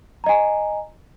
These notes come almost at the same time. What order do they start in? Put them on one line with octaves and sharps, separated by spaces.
A#5 D#5 G#5